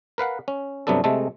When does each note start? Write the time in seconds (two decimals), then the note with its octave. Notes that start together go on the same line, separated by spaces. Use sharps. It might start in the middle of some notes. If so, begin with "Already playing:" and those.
0.18 A#4 B4 F5 F#5
0.48 C#4
0.87 G2 C3 F#3 B3 D4 A4
1.04 C3 G#3 A3 A4